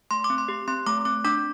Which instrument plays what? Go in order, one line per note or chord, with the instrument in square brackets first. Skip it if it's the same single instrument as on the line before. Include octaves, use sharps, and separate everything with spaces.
[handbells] A3 C6
D6
C4
C6
G4
C4 C6
A3 D6
C4 D6
D4 D6